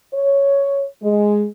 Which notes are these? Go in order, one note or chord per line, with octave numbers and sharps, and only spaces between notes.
C#5
G#3